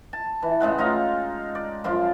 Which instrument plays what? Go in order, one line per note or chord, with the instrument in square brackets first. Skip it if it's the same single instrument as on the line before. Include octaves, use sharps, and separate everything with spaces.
[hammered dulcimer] A5
E3
A2 C#3 G#3 F#5
D#4 F4 F5 A#5
D5
F#2 F3 F4 D5